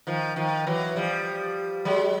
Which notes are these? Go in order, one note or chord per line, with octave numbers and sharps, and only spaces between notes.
D#3 F3
D#3 F3
E3 F#3
F3 G3
F#3 G#3